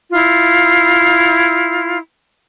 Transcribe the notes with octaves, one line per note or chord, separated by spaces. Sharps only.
E4 F4